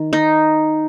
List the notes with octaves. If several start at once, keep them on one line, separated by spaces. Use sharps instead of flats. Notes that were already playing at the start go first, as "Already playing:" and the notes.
Already playing: D#3
D#4